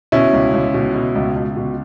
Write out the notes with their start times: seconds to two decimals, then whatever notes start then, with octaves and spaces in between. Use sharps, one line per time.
0.12 B2 C#4 E4
0.33 C#2
0.53 C#2
0.74 B2
0.94 B2
1.15 C#2
1.36 C#2
1.56 B2